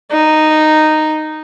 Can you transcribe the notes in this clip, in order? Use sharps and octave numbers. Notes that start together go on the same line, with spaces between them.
D#4